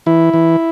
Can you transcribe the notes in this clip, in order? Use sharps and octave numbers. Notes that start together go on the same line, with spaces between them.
E3 E4
E3